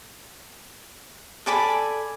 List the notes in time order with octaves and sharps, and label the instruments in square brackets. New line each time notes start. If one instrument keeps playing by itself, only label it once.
[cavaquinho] A4 D5 G#5 B5